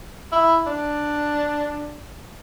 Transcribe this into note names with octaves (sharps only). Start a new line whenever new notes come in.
E4
D4